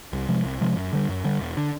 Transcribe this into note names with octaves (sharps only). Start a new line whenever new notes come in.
C2
C3 F3 G#3
C2
C3 F3 G#3
F#2
D3 G3
F#2
D3 G3
E1
D3